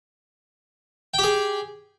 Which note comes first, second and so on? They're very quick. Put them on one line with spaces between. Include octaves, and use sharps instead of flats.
G5 G4 G#4